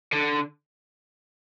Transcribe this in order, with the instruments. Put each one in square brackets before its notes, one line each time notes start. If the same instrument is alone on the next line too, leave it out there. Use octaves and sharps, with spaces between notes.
[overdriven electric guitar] D3